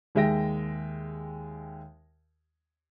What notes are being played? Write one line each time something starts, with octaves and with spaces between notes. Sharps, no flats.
D#2 G#3 E5 G5 A#6